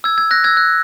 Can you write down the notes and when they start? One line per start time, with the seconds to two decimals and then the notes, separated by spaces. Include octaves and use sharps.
0.04 E6 G#6
0.18 E6 G#6
0.31 F#6 A#6
0.44 E6 G#6
0.57 F#6